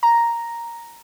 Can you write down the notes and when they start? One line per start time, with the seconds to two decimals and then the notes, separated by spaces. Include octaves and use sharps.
0.03 A#5